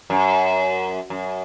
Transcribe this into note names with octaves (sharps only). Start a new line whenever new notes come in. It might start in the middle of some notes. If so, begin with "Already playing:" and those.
F#2
F#2